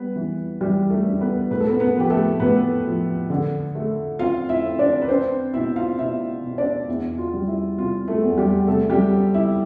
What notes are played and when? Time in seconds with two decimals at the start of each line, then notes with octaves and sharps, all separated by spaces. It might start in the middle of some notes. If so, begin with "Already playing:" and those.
Already playing: G3 B3 B4
0.16 E3
0.61 E3 G3 G4
0.90 A3 A4
1.06 D4
1.20 B3 B4
1.51 A2 B4
1.60 A4
1.69 B3 B4
1.80 B3 B4
1.95 F3 G4
2.10 A3 A4
2.40 A2 B3 B4
2.85 F3
3.30 D3
3.75 A3
4.19 C4 F4 F5
4.49 E4 E5
4.64 C4
4.79 D4 D5
5.02 B4
5.09 C4 D4 C5
5.54 B2 E4 E5
5.76 F4 F5
5.98 B2 E4 E5
6.44 B2
6.58 D4 D5
6.88 E2 E4
7.18 F4
7.33 G3
7.48 E4
7.78 C3 F4
8.08 A3 A4
8.22 E2
8.38 G3 G4
8.67 C3 A3 A4
8.90 G3 G4
9.13 C4
9.34 E4